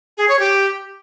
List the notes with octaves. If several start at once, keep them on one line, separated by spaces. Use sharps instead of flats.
G#4
C#5
G4